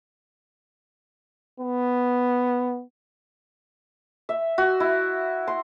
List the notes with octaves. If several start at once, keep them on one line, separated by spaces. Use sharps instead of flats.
B3
E5
F#4
E4
C6